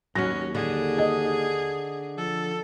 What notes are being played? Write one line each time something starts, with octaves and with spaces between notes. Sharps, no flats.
D#2 F#3 B3 C#4 A#6
D3 G#4
D#5
F3 A4